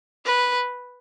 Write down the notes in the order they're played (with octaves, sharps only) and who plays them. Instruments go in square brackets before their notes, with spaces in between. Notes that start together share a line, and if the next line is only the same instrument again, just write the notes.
[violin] B4